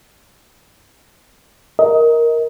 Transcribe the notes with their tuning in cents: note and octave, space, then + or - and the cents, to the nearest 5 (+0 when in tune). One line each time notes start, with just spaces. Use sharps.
A#4 +5 D#5 +25